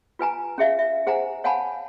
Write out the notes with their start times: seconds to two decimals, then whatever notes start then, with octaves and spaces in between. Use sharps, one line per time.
0.19 F4 B4 G#5 A#5
0.58 C#4 G#4 E5 F5
0.79 E5
1.06 G#4 C5 F#5 G#5 A#5
1.44 C#5 F5 F#5 G#5 A5 B5